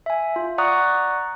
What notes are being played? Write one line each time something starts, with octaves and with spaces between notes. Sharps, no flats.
E5 G#5
F4
D5 F#5 A#5 C#6 D#6 F#6